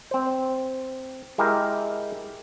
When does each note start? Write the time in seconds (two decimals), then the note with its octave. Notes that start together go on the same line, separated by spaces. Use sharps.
0.11 C4 C5
1.38 G#3 E4 G4 A#4